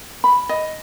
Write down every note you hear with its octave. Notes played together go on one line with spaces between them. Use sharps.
B5
D#5